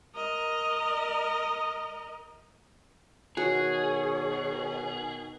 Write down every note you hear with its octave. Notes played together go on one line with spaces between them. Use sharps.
A#4 D#5
B2 D#3 F#4 G#4 C#5